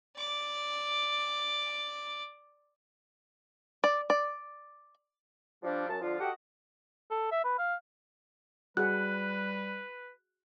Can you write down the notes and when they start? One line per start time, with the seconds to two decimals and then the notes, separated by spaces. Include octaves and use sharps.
0.17 D5 D6
3.84 D5
4.10 D5
5.63 F3 G3 D4
5.88 F#2 A5
6.02 D3 F3 D4 F4
6.19 F#4 G4 A4 D#5 F#5 G5
7.11 A4
7.32 E5
7.44 B4
7.58 F5
8.77 G3 F#4 G#4 B4 F#5 F#6